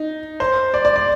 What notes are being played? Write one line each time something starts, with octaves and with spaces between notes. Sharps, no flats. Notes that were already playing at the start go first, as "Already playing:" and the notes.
Already playing: D#4
C5
D5
D5
D5